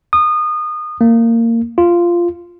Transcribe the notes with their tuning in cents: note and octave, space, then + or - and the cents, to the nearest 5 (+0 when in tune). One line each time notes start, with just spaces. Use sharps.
D#6 -25
A#3 -20
F4 -10